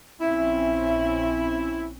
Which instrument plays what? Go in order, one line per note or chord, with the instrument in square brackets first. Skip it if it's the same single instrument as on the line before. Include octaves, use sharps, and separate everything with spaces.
[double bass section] A#1 C4 C#4 [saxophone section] E4 [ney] E5